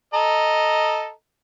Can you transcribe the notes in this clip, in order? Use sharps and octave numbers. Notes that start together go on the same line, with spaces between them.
A4 D#5 A#5